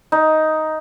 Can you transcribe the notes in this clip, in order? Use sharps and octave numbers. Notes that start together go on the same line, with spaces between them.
D#4